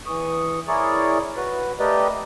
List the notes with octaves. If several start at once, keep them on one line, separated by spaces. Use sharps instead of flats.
E2 E3 C#6 D#6
E4 G#4 A#4 C#5 D5
F#4 B4
A3 G4 A#4 B4 D5 D#5